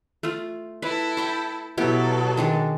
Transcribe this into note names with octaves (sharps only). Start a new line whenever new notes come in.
A3 F4
E4 A4 B4
G5 B5 C#6
B2 F#3 B3 E4 G4 A4
D#3 G#3 D4